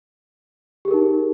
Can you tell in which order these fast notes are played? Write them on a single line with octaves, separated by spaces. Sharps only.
G4 G#4 A#4 D#4